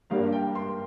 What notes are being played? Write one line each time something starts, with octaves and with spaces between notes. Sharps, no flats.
G2 G3 A#3 D4 F5
G5
C6